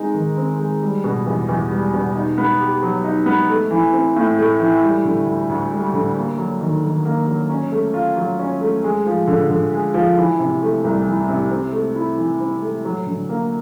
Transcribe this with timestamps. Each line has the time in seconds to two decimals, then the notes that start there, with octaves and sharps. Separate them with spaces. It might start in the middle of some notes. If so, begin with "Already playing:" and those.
Already playing: G#3 C4 D#4
0.14 D#3
0.37 C4
0.59 G#3
0.82 G3
1.04 B2
1.27 E2
1.49 E2
1.71 G3
1.94 B2
2.15 D#4
2.38 B3
2.60 G4
2.82 F#3
3.04 D#4
3.26 B3
3.50 A3
3.71 E3
3.93 C4
4.16 A2
4.39 A3
4.60 E3
4.83 G3
5.05 D3
5.27 D2
5.49 D2
5.72 G3
5.93 D3
6.16 A#3
6.38 F#3
6.60 D#3
6.84 D#3
7.05 A#3
7.27 F#3
7.49 C#4
7.72 A3
7.94 F4
8.17 F#3
8.39 C#4
8.61 A3
8.84 G#3
9.06 F3
9.27 D3
9.50 D3
9.73 G#3
9.94 F3
10.17 E3
10.39 C3
10.62 A3
10.84 C2
11.06 E3
11.29 C3
11.50 C4
11.72 A3
11.95 E4
12.18 E3
12.40 C4
12.62 A3
12.85 F#3
13.06 D3
13.29 A#3